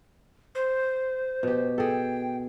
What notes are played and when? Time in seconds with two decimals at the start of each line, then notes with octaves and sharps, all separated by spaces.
0.55 C5
1.43 B2 G4
1.78 G#4 A4 G5